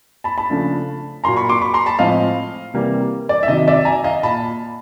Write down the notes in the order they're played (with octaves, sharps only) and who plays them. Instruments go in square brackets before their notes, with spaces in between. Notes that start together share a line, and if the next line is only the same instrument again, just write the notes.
[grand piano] A5 B5
A5 B5
C#3 F3 A3 D4
A#2 F#3 A#3 A#5 C6
B5 C#6
C6 D6
B5 C#6
A#5 C6
A5 B5
A2 F3 G#3 C4 D#5 F5
C3 E3 G3 A#3
D5
E5
C3 D#3 F#3 D#5
D5 E5
G#5 A#5
D#5 F5
A#2 A5 B5